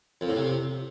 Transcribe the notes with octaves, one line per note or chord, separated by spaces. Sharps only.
F2
A2
C3